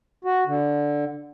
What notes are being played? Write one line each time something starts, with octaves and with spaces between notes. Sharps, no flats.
F#4
D3